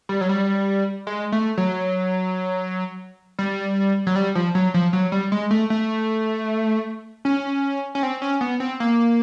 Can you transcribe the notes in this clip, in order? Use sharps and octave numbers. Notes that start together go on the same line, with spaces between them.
G3
F#3
G3
G#3
A3
F#3
G3
F#3
G3
F3
F#3
F3
F#3
G3
G#3
A3
A3
C#4
C#4
C4
C#4
B3
C4
A#3